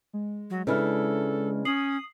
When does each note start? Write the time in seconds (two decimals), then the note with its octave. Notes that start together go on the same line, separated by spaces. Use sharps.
0.13 G#3
0.50 F#3
0.67 C#3 D4 E4 A4 B4 F6
1.65 C#4 D#6 C7 F#7